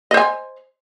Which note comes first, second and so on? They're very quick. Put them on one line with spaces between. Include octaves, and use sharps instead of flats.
D#5 C5 G#5